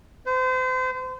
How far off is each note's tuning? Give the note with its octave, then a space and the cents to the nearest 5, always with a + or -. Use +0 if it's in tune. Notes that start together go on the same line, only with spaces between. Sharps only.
C5 -35